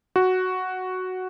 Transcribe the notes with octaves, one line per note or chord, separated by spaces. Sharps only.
F#4